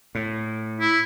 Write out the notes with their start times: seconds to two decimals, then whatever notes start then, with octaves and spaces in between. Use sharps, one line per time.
0.15 A2
0.80 E4